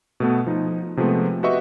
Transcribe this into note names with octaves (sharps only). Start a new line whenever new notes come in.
B2 A3 B3
F3 D#4
C3 F3 G#3 A3 B3
F#4 G4 B4 D#5 E5 C#6